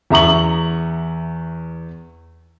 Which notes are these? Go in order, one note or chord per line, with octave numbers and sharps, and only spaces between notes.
E2 E5 A#5 C#6 F#7